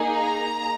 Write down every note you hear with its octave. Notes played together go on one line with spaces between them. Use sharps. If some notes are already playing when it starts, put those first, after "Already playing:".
Already playing: A#3 D#4 G#4
A#5